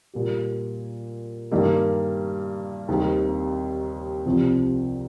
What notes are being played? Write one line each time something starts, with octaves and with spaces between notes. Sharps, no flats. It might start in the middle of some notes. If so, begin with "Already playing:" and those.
A#2 G3 A#3 G4
G2 D#3 A#3 G4
D#2 D#3 G3 C4
C2 C3 F3